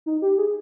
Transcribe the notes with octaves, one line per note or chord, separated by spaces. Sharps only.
D#4
G4
G#4